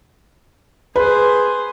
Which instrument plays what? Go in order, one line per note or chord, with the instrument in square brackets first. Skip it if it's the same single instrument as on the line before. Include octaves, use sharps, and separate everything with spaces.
[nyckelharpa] G#4 C5 [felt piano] B4